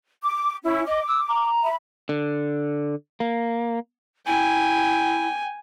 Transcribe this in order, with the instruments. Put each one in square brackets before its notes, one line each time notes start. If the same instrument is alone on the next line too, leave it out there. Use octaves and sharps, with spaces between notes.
[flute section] D6
C#4 E4
[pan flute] D#5 [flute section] D6
[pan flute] E6
A#5
[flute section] E5 B5
[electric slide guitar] D3
A#3
[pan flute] E4 [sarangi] G5 [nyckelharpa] G#5